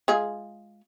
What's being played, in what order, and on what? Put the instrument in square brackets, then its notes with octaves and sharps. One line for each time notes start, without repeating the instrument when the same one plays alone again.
[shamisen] G#3 F4 G#4